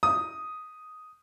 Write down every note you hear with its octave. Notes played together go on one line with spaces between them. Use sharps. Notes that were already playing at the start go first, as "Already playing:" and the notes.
D#6